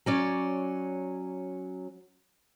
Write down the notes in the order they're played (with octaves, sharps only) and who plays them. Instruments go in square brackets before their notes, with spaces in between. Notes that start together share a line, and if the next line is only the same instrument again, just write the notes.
[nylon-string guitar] F#3 C#4 D5